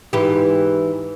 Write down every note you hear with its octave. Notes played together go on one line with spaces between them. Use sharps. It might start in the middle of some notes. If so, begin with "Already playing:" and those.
G#2 E3 G4